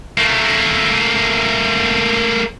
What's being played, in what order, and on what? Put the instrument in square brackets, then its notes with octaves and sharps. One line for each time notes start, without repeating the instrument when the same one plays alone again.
[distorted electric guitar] A3 A#3